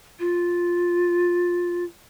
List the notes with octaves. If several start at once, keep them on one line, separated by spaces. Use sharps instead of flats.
F4